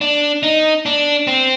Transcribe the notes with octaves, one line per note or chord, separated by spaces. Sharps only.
D4
D#4
D4
C4